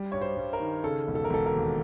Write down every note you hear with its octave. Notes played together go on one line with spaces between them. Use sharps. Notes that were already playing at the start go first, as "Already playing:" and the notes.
Already playing: G3
G2 C#5
C5
G2
A#4
D#3
C#3 A4
E1
A4
A#4
E1 A4
A#4
D#2